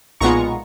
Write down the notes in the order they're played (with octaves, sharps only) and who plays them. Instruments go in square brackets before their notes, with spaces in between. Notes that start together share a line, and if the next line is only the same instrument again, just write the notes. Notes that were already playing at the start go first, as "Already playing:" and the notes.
[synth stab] B1 A#2 G#3 B3 F4 A#5 C#6